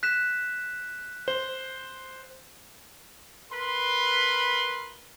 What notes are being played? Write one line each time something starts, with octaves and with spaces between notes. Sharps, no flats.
F#6 B6 E7
C5 G7
A#4 B4 B5 C6